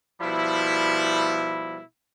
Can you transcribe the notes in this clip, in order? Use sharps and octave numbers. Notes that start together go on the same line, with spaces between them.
B2 F3 G3 E4